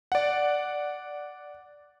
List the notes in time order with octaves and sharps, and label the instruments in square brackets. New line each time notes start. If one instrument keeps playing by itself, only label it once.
[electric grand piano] D5 F#5